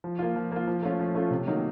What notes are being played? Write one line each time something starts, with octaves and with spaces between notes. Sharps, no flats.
F3
A#3 F4
F3
A#3 F4
F3
A3 C#4 F4
F3
A3 C#4 F4
C3
D#3 F#3 A#3 D#4